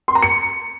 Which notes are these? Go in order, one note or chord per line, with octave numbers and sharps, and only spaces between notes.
C6
A#5
C#7